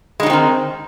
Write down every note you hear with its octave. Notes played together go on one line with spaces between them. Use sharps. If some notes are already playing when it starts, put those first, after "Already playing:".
D#3 F#3 G#3 C4 D#4